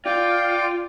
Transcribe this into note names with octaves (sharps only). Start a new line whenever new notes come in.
F4 D5 G5